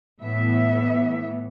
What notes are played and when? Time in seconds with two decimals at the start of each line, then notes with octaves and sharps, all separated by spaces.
0.22 A2 E3 B3 E5